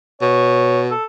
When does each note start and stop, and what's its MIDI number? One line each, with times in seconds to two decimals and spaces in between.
0.22 0.92 47
0.22 0.82 73
0.91 1.04 69